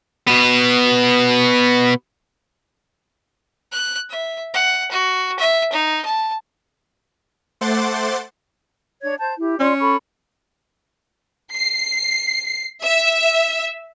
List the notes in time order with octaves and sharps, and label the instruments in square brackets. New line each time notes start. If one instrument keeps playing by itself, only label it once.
[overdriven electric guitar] B2 B3
[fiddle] F#6
E5
F#5
F#4
E5
D#4
A5
[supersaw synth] A3 C5 F#5 C6 D6 A6
[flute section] D4 C#5 G#6
C5 A5 G6
[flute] E4 [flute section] G4
[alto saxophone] C#4 [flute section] F4 C6 [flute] D5
[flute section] A4 B5 [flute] C#6
[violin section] C7
E5